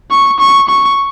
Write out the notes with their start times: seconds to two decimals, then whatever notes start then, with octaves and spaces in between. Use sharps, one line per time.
0.11 C#6
0.40 C#6
0.69 C#6